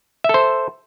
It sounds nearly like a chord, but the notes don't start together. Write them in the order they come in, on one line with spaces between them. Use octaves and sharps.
E5 A4 C5